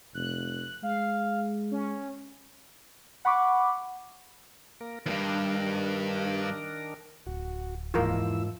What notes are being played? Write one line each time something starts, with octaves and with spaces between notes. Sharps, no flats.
F1 F#6
G#3 F5
C#4
F#5 B5 C#6 D6
A#3 A#4
E2 G2 D#3 D4 A#4
D1 F#4
E2 G#2 F3 A#3 E4 F4 A#4 E6